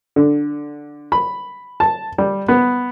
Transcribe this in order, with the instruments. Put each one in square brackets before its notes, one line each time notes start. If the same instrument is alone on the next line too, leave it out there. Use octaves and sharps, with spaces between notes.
[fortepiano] D3
B5
A5
G3
B3